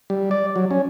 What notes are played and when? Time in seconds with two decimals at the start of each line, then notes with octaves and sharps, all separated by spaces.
0.10 G3
0.31 D5
0.56 F#3
0.71 C#4